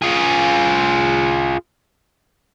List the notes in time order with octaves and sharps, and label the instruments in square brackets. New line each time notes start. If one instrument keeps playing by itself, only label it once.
[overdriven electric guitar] F4 G#4